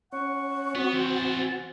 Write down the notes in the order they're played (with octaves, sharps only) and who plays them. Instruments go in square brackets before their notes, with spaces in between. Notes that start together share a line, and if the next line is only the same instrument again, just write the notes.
[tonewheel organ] C#4 [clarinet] F#5 [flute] C#6
[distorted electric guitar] B3 [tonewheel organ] C4 F#4
[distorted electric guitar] E3 C5
[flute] A6